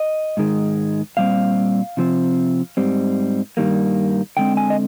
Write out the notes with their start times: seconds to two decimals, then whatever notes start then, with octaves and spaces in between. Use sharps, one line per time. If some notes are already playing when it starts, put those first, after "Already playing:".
Already playing: D#5
0.37 G#2 D#3 G#3
1.17 A#2 G3 C4 F5
1.97 C3 F3 C4
2.77 G#2 G3 C4
3.57 G2 D#3 G3 A#3
4.37 D3 G#3 C4 G5
4.57 G#5
4.70 D#5